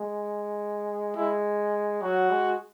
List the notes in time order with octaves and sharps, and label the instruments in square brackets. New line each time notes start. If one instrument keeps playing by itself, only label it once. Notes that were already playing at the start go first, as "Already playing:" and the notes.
Already playing: [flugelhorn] G#3
[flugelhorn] G#3 [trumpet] E4
[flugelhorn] F#3 [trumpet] F#4
[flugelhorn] G#3